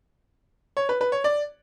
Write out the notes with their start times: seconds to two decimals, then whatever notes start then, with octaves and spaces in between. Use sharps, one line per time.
0.77 C#5
0.89 B4
1.01 B4
1.12 C#5
1.24 D5